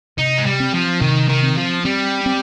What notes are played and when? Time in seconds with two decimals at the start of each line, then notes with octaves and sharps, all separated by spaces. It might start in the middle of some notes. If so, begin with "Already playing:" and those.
0.18 C3 D#4
0.38 G#3
0.46 G3
0.60 C4
0.74 F3
1.01 C3 D#3
1.29 D#3
1.43 C4
1.57 F3
1.84 G3 C4
2.26 C4